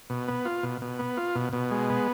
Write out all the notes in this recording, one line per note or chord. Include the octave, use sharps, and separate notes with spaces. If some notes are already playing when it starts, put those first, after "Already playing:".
B2
B3
F4
B2
B2
B3
F4
B2
B2
G#3
B3